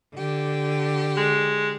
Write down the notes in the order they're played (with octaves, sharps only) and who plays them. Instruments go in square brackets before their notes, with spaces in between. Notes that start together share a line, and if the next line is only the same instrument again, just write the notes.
[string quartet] D3 G4
[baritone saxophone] G#3